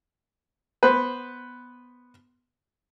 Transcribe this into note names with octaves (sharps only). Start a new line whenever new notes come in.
B3 B4 C5